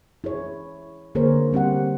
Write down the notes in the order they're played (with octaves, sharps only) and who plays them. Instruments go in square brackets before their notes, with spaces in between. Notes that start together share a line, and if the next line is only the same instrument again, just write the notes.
[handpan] E4 G#4 C#5
D3 A#3 G#4 A#4 C5 C#5
G3 C4 G4 F#5